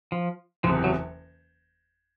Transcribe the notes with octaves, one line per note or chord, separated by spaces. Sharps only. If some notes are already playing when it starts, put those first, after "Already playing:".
F3
F#1 E2 C3 F3
F#3